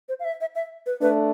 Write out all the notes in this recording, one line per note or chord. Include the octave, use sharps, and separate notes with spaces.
C5
F5
E5
E5
E5
B4
A3 D4 B4